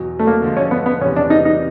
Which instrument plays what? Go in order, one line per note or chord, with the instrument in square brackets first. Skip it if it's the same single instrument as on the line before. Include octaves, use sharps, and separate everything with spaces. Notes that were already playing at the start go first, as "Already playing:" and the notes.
Already playing: [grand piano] E2 B2 F#3
[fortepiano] A3
A#3
[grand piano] D3 F3 G#3
[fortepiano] C#4
B3
B3
[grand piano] E2 C3 E3 [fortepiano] C#4
[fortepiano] D4
D#4
D#4